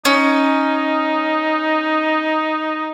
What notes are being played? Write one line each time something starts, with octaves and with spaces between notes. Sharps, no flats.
C#4 D#4